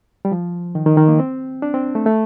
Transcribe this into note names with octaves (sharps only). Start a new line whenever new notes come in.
G3
F3
D#3
D#3
D#3
A#3
C4
D4
C4
A3
A3